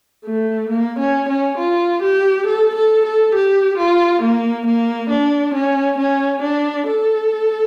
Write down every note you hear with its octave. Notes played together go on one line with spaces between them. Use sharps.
A3
A#3
C#4
C#4
F4
G4
A4
A4
A4
G4
F4
A#3
A#3
D4
C#4
C#4
D4
A4